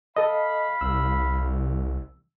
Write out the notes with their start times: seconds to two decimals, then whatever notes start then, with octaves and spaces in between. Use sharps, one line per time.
0.16 A4 D#5 F5 B5
0.81 C2 E6